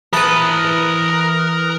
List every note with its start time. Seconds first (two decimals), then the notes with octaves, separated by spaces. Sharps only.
0.13 E3 A#4 B4 A5 B5 D#6 F#6